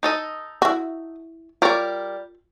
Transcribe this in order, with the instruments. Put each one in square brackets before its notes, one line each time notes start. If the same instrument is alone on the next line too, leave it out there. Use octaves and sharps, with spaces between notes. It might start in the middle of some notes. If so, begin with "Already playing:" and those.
[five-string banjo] D#4 A4 D#5
[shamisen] E4 F#4
[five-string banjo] G3 A#4 D5 [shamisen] F4 C#5